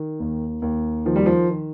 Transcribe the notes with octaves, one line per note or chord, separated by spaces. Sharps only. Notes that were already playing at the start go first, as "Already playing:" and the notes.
Already playing: D#3
D#2
D#2
D#3 F3
G3
F3
D#3